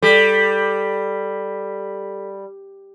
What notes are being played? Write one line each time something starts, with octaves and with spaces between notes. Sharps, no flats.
G3 A4 B6